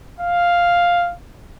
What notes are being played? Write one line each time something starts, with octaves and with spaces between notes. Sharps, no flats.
F5